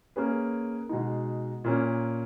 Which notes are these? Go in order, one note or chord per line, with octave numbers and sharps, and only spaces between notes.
A#3 C#4 G#4 B4
B2 G#3 D#4
A#2 A#3 C#4